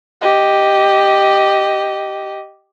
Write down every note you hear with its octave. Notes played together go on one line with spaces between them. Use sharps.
G4 D#5